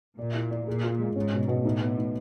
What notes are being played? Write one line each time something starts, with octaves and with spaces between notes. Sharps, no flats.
A#2 D5
E4
D5
A#2 G#4
F4
G#3
G#2 C#4
B2
B2
A2 D#4
B3
D#4